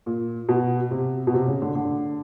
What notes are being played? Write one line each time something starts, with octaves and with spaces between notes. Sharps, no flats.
A#2
B2
C3
B2
C3
C#3
D3
D3